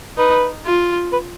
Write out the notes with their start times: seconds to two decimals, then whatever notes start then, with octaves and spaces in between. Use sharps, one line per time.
0.17 D#4 B4
0.66 F4
1.13 B4